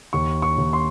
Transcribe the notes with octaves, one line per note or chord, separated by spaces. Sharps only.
D#2 C#6
C#6
D#2
C6